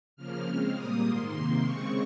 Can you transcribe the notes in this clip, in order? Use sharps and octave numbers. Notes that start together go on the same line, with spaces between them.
C#3 F3 A#3 F6
C#3 G#3 C4 F6
A#2 G3 A#3 D#6
G#2 D#3 A#3 C6
C3 D#3 A#3 C6
C#3 G#3 C4 C#6